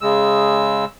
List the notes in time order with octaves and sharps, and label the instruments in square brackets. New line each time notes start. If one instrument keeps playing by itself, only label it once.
[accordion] C#3 G#3 E6